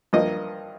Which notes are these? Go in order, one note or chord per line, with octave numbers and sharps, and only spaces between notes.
G2 F3 A#3 D#5